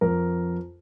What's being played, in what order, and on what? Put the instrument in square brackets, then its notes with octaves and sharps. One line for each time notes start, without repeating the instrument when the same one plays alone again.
[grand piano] F2 A#4